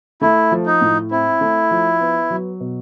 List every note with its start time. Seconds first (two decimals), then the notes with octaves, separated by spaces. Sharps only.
0.22 A3 E4
0.51 F3
0.66 D#4
0.81 A2
1.11 C4 E4
1.41 A3
1.71 F3
2.00 B3
2.30 F#3
2.60 B2